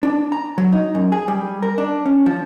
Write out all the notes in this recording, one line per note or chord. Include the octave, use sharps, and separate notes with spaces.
D4
A#5
F#3
D#4
F#2
G#4
G3
A#4
D4
C#4
F3